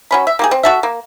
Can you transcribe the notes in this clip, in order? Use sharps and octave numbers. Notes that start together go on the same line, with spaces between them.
F#3 C#4 B5
E5
A#3 G4 G#4
C4
F#4 A4 E5
A#3